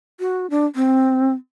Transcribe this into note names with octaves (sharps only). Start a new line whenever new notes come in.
F#4
D4
C4